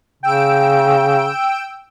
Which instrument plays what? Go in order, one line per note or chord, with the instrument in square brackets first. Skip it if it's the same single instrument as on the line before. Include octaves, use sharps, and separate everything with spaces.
[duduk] C#3 [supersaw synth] G5 E6 D7